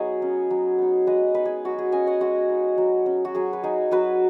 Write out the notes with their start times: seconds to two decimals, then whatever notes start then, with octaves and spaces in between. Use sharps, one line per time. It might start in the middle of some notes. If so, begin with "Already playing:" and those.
Already playing: F#3 B3 D#4 G#4 C#5 D#5
0.22 C#4
0.51 F#3
0.78 B3 D#4
1.07 G#3 B4 D#5
1.35 B3 D#4 B4
1.45 G#4
1.65 F#3 F#4
1.79 G#4
1.92 C#4 D#5 G#5
2.07 C#5 F#5
2.21 G#3 F#4
2.49 D#4
2.78 F#3
3.06 C#4
3.25 F#4
3.35 F#3 G#4
3.53 B4
3.64 D#4 G#4
3.91 F#3 F#4 B4